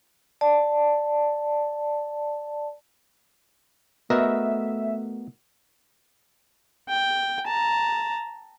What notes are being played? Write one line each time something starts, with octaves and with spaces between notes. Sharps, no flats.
D5 A5
A3 B3 F#4 A#4 D#5 E5
G5
A5 A#5